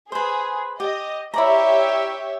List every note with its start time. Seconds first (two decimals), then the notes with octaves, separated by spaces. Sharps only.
0.12 G#4 B4 C5
0.80 G4 D#5
1.34 E4 G4 C#5 D5 E5 A#5